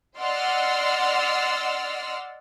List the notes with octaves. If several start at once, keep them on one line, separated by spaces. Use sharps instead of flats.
D5 D#5 F#5 C6 E6 F6